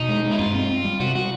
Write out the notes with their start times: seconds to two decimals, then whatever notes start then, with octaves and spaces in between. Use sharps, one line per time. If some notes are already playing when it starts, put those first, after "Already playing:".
Already playing: B2 D#4
0.09 G#3
0.24 G#3
0.32 E4
0.38 G2 F4
0.54 C4
0.69 C4
0.84 G3
1.00 C3 F#4
1.15 G3 F#4